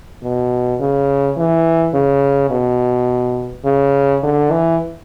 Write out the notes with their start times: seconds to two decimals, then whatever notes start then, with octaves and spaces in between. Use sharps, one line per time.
0.23 B2
0.80 C#3
1.37 E3
1.94 C#3
2.50 B2
3.65 C#3
4.23 D3
4.51 E3